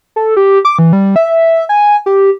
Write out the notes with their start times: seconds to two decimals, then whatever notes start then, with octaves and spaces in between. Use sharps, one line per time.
0.16 A4
0.37 G4
0.65 D6
0.79 E3
0.93 G3
1.16 E5
1.69 G#5
2.06 G4